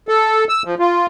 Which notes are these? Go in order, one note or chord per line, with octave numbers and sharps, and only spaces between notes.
A4
E6
F3
F4